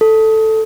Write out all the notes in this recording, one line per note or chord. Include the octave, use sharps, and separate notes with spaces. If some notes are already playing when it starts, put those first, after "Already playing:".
A4